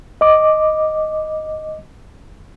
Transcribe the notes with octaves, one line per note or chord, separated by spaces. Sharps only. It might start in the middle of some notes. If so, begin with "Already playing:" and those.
D#5 D6